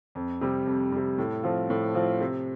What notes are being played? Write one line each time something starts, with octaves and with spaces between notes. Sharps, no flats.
F2
C3 G3
F2
C3 G3
A2
F3 C4 F4
A2
F3 C4 F4
C3